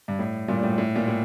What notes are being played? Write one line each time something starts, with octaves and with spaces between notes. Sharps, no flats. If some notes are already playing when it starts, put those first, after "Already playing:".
G2
A2
G2 A#2
A2
A2
A#2
A2